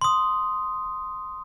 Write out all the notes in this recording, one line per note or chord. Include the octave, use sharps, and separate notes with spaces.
C6 D#6